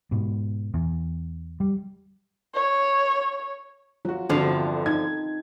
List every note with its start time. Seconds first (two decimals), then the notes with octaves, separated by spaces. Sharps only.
0.11 G#2 B2
0.74 E2
1.60 G3
2.55 C#5
4.05 F#3 F4 F#4
4.29 G1 E2 D3 F3 C4 D4 F#4
4.86 D#4 G#6